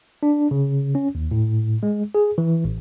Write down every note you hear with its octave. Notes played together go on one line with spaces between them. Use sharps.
D4
C#3
C#4
D#2
A2
G#3
G#4
E3
A1